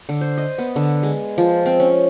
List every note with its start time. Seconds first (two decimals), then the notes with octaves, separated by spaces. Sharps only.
0.09 D3
0.21 C5
0.38 D#5
0.58 B3
0.76 D3
1.03 G#3
1.38 F3
1.66 C4
1.80 C#4